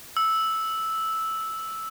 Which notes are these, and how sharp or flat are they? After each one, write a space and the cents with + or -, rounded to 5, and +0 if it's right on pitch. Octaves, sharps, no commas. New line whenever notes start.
E6 -5